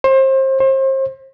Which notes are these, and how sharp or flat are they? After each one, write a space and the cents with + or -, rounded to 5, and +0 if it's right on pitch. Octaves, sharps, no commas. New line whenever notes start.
C5 +30
C5 +35